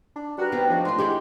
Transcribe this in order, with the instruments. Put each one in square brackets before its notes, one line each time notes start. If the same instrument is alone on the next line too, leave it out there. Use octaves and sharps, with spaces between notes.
[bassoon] D4
[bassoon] G3 [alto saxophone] F#4 [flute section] A#4 B4 F#6
[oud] D#3 C4 [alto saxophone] B3
[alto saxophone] F3 [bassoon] D4 [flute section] F#4 D#5
[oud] A3 F4 [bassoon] D4 [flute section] C6
[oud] D#3 E4 F#4 [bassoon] G#3 [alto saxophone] G4